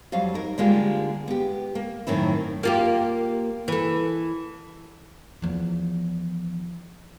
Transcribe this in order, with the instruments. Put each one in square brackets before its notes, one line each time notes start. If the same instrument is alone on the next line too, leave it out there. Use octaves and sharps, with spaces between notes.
[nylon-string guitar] F2 F#3 G3 F5
D#4 A#4
D3 G3 G#3 A#3 F4 G4
B3 G4
A#3
F#2 A2 D#3 C4 E4
[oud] A#3 F4 G4
E3 A4
[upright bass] E2 F3